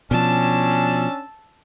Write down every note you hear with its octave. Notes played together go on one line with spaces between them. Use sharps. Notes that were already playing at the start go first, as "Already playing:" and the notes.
B2 F3 C#4 D4 A5 E6